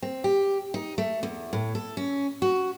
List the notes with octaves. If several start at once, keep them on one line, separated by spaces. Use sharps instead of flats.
C4
G4
D#4
A3
E2
A2
A4
C#4
F#4